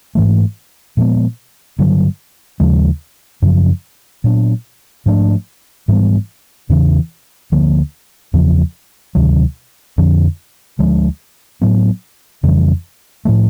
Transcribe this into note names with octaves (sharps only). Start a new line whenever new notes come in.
G#2 E3 A3
A#2 F3 G#3 B3
G2 D3 F#3
D#2 C#3 F3 G#3
F#2 C#3 F3
A#2 F#3 B3 D4
G#2 F3 A3 D4
G#2 E3 G3 B3
E2 C#3 E3
D2 D3 F3 A#3
E2 C#3 F3
D2 C3 D#3 F#3
F2 D3 F3
D2 D3 F3 G#3
A2 F#3 B3
F2 C#3 E3 G3
A2 F3 A3